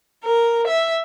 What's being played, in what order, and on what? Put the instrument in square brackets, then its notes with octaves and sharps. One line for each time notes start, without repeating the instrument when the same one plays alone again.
[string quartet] A#4
E5